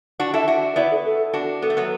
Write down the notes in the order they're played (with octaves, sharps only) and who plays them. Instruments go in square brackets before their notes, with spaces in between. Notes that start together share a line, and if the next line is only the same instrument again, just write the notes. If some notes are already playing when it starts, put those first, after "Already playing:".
[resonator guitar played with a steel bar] D4 F#4
[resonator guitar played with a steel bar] E4 A4 [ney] E5
[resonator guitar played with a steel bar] D4 F#4 [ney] E5
[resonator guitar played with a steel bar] B3 E4 [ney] D5
[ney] A4
A4
[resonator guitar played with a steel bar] D4 F#4
[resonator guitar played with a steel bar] B3 [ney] A4
[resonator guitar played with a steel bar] A3
F#3 B3